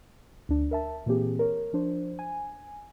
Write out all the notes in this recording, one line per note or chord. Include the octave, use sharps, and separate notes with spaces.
D2 D4
A#4 E5 A5
A#2 E3 A#3 C4 G4 G#4
A#4 C#5
F3 D4 C5
G#5